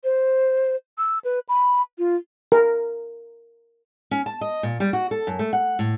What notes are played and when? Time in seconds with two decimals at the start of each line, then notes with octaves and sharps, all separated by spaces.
0.04 C5
0.98 E6
1.25 B4
1.49 B5
1.98 F4
2.52 A#4
4.11 C#4
4.26 A5
4.41 D#5
4.63 A#2
4.80 G3
4.93 F#4
5.11 A4
5.27 F#2
5.39 A3
5.53 F#5
5.79 A2